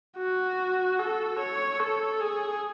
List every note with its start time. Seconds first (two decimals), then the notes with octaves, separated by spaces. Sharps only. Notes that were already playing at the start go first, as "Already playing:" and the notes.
0.18 F#4
0.99 A4
1.40 C#5
1.80 A4
2.21 G#4